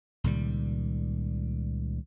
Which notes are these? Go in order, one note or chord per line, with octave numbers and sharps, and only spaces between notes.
C#2 A#2 D#3 G3